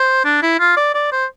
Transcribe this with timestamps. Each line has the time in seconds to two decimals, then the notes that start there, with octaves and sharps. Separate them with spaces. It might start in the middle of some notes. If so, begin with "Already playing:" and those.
Already playing: C5
0.25 D4
0.42 E4
0.59 F4
0.77 D5
0.94 D5
1.12 C5